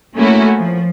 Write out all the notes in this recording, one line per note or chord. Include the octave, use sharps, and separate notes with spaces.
A3 A#3 C#4 E4 F#4
F3